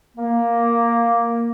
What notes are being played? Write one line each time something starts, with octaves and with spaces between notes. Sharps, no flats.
A#3